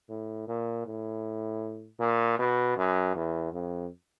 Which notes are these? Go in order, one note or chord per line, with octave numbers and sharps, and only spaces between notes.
A2
A#2
A2
A#2
B2
F#2
E2
F2